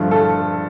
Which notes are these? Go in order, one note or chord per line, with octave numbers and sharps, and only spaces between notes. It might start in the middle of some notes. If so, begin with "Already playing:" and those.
Already playing: G2 D3 F3 A3
A4